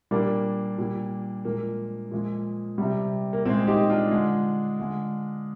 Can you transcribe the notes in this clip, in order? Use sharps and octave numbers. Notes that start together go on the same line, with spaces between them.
A#2 G3 A#3 D4
A#2 G3
A#2 F3 G#3 A#3
A#2 F3 G#3
C3 G3
A#3
A#2 G#3 C4
D#4 G4
D4 F4
D3 G#3
D3 G#3